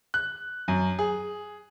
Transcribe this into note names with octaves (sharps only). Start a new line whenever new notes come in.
F#6
F#2
G#4